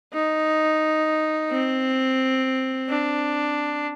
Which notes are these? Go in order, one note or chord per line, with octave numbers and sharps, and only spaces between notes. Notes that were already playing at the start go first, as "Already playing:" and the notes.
D#4
C4
D4